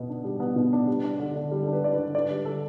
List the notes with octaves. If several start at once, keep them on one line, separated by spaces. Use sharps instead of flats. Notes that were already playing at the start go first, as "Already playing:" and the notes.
Already playing: B2 B3
D4
G3
B3
B2
D4
G3
D4
D3
D3
G3
D4 A4
B4
D3 D5
B4
D3
D3 D5
G3
A4